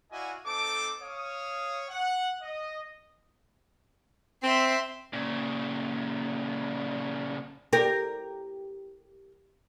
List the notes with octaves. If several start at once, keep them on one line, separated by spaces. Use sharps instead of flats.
E4 F#4 D5 D#5 F5 G#5
C4 D#4 A4 A5 D6
C#5 F5 D#6
F#5
D#5
C4 E5 C6
A#2 C#3
G4 A#4